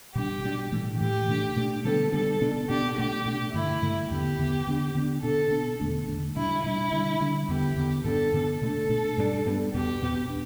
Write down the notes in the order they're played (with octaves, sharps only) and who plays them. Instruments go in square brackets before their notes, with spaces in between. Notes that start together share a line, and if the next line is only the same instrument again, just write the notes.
[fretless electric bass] B2 G3 D4 [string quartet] G4
[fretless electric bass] B2 G3 D4
A2 E3 A3
[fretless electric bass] A2 E3 A3 [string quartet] G4
[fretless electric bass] B2 A3 D4
B2 A3 D4
[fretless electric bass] D3 G3 B3 D4 [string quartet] A4
[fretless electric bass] D3 G3 B3 D4 [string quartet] A4
[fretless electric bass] B2 B3 D4
[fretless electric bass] B2 B3 D4 [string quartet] G4
[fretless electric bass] B2 A3 D4 [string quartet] G4
[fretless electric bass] B2 A3 D4
[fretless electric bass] G2 D3 A3 [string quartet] E4
[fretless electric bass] G2 D3 A3
[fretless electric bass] E2 D3 B3 [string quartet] G4
[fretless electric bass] E2 D3 B3
D3 B3 D4
D3 B3 D4
[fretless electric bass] B2 B3 D4 [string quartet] A4
[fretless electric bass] B2 B3 D4
E2 D3 A3 D4
E2 D3 A3 D4
[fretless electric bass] B2 G3 D4 [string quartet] E4
[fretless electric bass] B2 G3 D4 [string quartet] E4
[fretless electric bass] D3 G3 D4
D3 G3 D4
[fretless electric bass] E2 D3 B3 [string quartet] G4
[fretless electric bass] E2 D3 B3
[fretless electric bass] G2 D3 B3 D4 [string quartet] A4
[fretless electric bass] G2 D3 B3 D4
[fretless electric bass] B2 A3 D4 [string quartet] A4
[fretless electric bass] B2 A3 D4
G2 G3 B3 D4
G2 G3 B3 D4
[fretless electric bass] E2 B2 B3 [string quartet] G4
[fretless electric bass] E2 B2 B3
D4